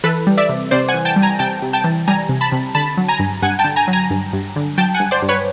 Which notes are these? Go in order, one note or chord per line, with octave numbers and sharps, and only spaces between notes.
E3 A4 B4
G3
D5 E5
C3
C3 C5 D5
F#5 G#5
E3
G5 A5
G3
G#5 A#5
C3 G5 A5
C3
G5 A5
E3
G3 G#5 A#5
C3
A5 B5
C3
D3 A5 B5
F#3
G#5 A#5
G2
G2 F#5 G#5
G5 A5
D3
G#5 A#5
F#3
G#5 A#5
G2
G2
D3
F#3 G5 A5
F#5 G#5
G2
C5 D5
G2
B4 C#5